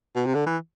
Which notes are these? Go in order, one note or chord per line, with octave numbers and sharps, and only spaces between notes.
B2
C3
D3
E3